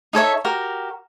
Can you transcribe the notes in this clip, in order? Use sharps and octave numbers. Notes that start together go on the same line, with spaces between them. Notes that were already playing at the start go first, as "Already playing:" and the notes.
D#4 A4 C#5 E5
F#4 G4 A#4